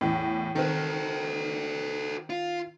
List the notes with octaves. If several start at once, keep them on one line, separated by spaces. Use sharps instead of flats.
E2 A2
D#3 C4 F#4 A4
F4